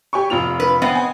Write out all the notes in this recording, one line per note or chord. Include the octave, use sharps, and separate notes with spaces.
G4 G#5 C#6
F1 F4 F7
B4
B3 C4 D#5
G#5